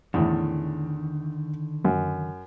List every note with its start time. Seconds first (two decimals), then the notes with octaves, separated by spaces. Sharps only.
0.14 E2 A2 D3 D#3
1.85 F#2